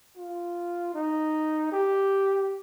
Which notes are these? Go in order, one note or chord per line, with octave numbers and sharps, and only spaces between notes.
F4
D#4
G4